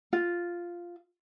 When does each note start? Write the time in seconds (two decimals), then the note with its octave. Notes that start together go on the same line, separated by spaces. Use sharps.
0.13 F4